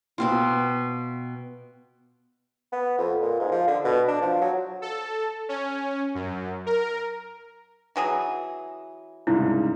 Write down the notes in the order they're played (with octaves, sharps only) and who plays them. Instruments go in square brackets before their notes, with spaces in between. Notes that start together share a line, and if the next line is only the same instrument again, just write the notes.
[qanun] B2 C4 F4
[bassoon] B3
F2
A#2
G#2
F3
D3
B2
D4
F3
F#3
[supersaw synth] A4
C#4
F#2
A#4
[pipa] E3 F#3 G#4
[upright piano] C2 G#2 C#3 [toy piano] E4